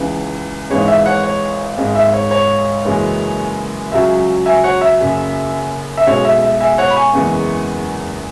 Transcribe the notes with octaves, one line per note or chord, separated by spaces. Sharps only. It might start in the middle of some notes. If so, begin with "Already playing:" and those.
Already playing: C#2 C#3 E3
G#1 G#2 E3 G#3 C#5
E5
C#5 F#5
C#5
G#1 G#2 G#3
E5
C#5
C#5
F#1 F#2 E3 G#3
C#2 C#3 F#3 E5
E5 G#5
C#5 F#5
E5
F#1 F#2 C#3
E5
B1 B2 G#3 C#5
E5
E5
E5 G#5
C#5 F#5
B5
G#5 C#6
F#1 E2 E3 G#3